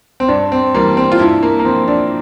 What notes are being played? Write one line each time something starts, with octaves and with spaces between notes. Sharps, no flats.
C4
G2 D4
C4
E3 G3 A#3
C4
F4
G2 E4
A#3
A#3
F3 C4
D4